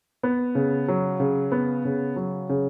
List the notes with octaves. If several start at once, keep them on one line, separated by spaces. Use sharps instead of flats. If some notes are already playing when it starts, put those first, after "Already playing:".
B3
C#3
F#3
C#3
B3
C#3
F#3
C#3